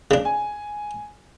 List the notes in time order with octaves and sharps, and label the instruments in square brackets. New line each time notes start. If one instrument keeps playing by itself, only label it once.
[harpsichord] C#3 D4
[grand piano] G#5